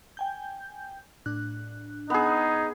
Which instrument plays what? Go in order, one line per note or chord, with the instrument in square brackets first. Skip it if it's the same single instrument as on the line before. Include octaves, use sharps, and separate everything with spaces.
[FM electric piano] G5 G#5 G6
A2 D4 F#6
[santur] B3 G#4 [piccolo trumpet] D#4